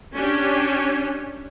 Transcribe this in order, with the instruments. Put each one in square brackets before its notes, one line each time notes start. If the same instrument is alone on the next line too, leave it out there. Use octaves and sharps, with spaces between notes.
[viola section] C#4 D4 G4